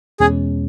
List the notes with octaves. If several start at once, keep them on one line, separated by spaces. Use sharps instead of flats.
E2 B2 G#3 C#4 G#4